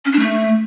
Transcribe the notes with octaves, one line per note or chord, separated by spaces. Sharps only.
C#4
D4
A3